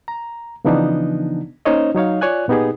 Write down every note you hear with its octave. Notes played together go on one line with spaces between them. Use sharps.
A#5
C#3 E3 F3 B3 D4 D#4
A#3 C#4 D#4 C5 C#5 D#5
F#3 D#4 C#5 F5
F4 C#5 D5 G#5 F#6
A#2 B3 D#4 G4 G#4